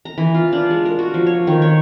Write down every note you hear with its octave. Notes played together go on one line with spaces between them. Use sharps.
A#5
E3
F4
D4
G#3
A#4
F#4
F3
C#5
D#3
C#5